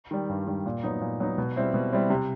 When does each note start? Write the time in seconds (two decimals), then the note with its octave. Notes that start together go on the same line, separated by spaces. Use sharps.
0.11 D#3 G3
0.29 G2
0.47 D#3 G3
0.66 A#2
0.83 F#3 B3 D#4
1.01 A#2
1.20 F#3 B3 D#4
1.38 B2
1.56 G3 C4 E4
1.74 B2
1.93 G3 C4 E4
2.10 C3